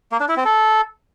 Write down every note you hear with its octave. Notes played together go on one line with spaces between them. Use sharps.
A#3
D4
E4
C4
A4